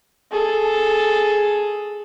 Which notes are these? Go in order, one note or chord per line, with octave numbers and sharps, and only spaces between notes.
G#4 A4